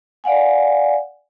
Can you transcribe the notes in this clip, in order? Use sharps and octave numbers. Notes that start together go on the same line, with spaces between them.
D5 F5 F#5 G#5